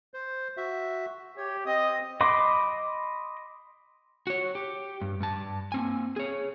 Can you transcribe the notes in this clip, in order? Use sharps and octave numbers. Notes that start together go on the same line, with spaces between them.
C5
F#4 E5
G4 C#5
C4 D#5 D#6
D#5 B5 C6 D6
F#4 C#5
G4
G2
G2 A5
A#3 C4 G#5
G#4 C#5